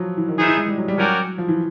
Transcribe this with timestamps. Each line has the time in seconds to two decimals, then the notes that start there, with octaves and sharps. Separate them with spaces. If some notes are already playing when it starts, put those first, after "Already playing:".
Already playing: F3 F#3
0.17 E3
0.28 D#3
0.38 E3 B3 D#4 G#4 C5 E5
0.48 E3
0.57 G#3
0.68 G3
0.78 F#3
0.88 G3
0.98 F#3 C#4 F#4 A#4 D5 G5
1.38 F3
1.48 E3